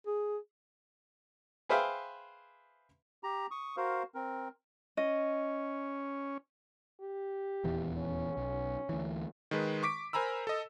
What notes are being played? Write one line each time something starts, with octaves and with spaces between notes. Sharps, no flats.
G#4
G#4 B4 C5 E5 F5 G5
G4 A#5
C#6 D#6
F#4 A#4 C5 F5
C4 A#4
C#4 D#5
G4
D#1 E2 E3
C#4
B1
D2 E3
D#3 G#3 B4
C#6 D6 B6 D7
A#4 C5 G#5 A#5 B5 E6
A4 D#5